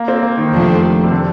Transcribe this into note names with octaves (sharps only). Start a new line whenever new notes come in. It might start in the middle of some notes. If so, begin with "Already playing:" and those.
Already playing: A#3
C4
A#3
D#3
F2 C3 F3 A3 D4
C3
D3